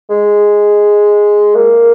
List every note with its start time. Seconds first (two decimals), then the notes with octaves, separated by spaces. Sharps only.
0.10 G#3
1.55 A#3